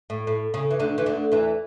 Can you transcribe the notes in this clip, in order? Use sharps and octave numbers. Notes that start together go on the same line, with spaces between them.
A2
A2
C#3
E3
D2 D3
E3
D2 D3
E2 E3